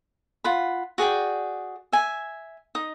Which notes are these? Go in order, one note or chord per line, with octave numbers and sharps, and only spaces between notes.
F4 F#5 B5
F#4 G#4 D5 G5
E5 G#5
D#4 D#6